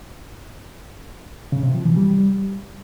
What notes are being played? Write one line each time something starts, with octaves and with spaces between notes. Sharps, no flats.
C#3
C3
F3
E3
G3